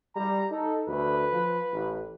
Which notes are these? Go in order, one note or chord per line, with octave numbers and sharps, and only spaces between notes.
G3 A#5
D#4 A4
D2 B4
F3
A1